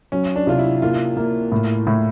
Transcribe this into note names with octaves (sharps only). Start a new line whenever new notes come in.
F#3 C#4
D4
C3 F4
E4
A#3 F4
A#3
A2
A2